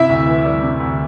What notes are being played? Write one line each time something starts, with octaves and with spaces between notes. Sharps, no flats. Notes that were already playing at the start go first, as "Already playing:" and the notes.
Already playing: C3 E4 E5
D2
E3
G3
C3
D2